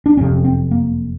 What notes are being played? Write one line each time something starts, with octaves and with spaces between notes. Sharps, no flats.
D4
F#1 F2 C3 C#4
C4
A#3